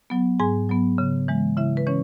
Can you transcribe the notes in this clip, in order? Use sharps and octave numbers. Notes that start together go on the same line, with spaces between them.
F#3 B3
G#2 G#4 G#5
F#3 B3
C#3
E3 G#3
C#3 E4 E5
B4
E3 C#4 C#5